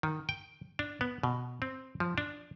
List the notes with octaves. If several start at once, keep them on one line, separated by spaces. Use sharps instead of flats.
D#3
G5
D4
B3
B2
C4
F3
D4